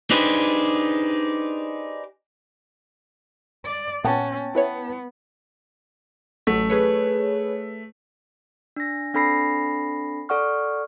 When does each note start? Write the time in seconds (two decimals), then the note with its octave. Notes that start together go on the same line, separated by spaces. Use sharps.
0.11 D4 D#4 G4 G#4 B4 C5
3.66 D5
4.04 A#2 B3 C#4 F#5 G5 A5
4.55 B3 E4 B4 C#5
6.47 A1 F#3 A3
6.70 G#4 B4 C#5
8.76 D4 A#6
9.14 C4 D4 A4 B5 A#6 C7
10.29 A4 D5 F#5 C#6 F6